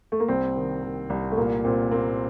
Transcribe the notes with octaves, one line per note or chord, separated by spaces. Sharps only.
A3
A#3
C2 C4
D#3
D#3
C2
A3
A#2 A#3
A#2 C4
A#3 C4